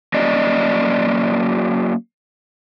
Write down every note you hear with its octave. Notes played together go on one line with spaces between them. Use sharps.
F#3 A#3 C#4 F#4 D5 D#5